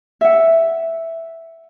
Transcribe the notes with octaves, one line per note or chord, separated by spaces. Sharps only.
E5 F#5